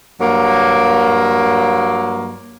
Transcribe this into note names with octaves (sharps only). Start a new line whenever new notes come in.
G2 F#3 A#3